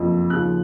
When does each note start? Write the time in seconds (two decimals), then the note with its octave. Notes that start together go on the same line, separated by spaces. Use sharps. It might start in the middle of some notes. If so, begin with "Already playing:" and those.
Already playing: F#1 F2 F3
0.30 D#2 C#3 F3 F#6